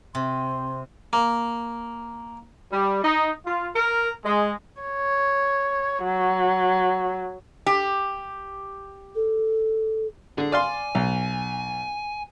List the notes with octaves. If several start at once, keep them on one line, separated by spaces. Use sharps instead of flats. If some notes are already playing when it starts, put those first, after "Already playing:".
C3 C6
A#3
G3
D#4
F4
A#4
G#3
C#5
F#3
G4
A4
D3 G#4
D5 F5 G#5 C6
B1